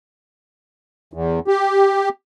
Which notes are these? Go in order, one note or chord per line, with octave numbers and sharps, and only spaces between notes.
E2
G4